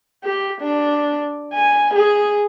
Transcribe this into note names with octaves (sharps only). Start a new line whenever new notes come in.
G4
D4
G#5
G#4